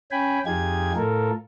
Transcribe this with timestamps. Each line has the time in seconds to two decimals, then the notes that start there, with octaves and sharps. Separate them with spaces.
0.11 C#4 G5 G#5 B5
0.46 F2 D#4 F4 G4 G#4 G#6
0.96 A2 F4 A4 A#4